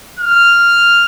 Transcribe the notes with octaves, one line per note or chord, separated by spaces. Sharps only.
F6